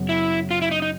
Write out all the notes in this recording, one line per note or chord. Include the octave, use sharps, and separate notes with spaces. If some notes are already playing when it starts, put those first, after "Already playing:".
Already playing: F#1 F#2 C#3 F#3 B3
E4
F4
E4
D#4
D#4